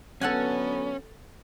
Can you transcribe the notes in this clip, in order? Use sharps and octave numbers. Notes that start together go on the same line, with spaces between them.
D3 F#3 B3 C#4 A4 F#5 G#5